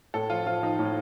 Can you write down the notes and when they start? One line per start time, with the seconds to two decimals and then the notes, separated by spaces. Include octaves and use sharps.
0.14 A2 A4
0.30 F3 F4
0.46 F3 F4
0.62 F3 D#4
0.79 A2